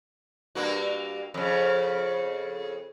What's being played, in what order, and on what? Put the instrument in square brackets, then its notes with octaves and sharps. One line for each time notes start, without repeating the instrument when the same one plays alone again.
[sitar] G2 A#3 F#4
F2 C#3